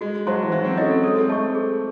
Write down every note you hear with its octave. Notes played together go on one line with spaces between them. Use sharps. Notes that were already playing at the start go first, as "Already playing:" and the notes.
G#3 F#4
F#3 C5 D#5 A5 C6
E3
F#3 D#4
C4
C#4 A4 D#5
C4
G#3 A4
C4
A3 D#5 A5 C#6
G#4